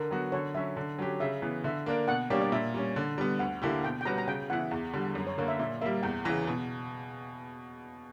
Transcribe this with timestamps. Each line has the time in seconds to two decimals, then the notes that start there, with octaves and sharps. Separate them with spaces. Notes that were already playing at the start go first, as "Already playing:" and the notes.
Already playing: D3 A#4
0.11 F#3 B3 F#4
0.32 D3 C#5
0.54 F#3 C#4 E5
0.77 D3
0.98 F#3 C#4 G4
1.20 C#3 E5
1.42 E3 B3
1.64 D3 E5
1.86 A#3 D4 A#4
2.08 B2 F#5
2.30 G3 A#3 D4 G4 C#5
2.42 D5
2.52 A#2 E5
2.74 G3 C#4
2.96 D3
3.18 G3 B3
3.39 D2 F#5
3.62 D3 A#3 E4 G4
3.84 B2 G5
4.01 G5
4.05 G3 C#4 F#4 B4 A#5
4.18 A#5
4.27 C#3 G5
4.50 E3 B3 E4 F#5
4.71 E2
4.93 D3 G3
5.15 F#2
5.27 C#5
5.38 D3 A#3 C#5
5.48 E5
5.59 A#2 E5
5.82 G3 A#3 E5
6.03 E2 G5
6.25 C#3 E3 A#5
6.47 B2